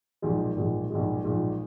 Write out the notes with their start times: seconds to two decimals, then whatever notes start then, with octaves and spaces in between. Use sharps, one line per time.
0.22 B1 A#2 F3 G#3
0.56 B1 A#2 F3 G#3
0.90 B1 A#2 F3 G#3
1.24 B1 A#2 F3 G#3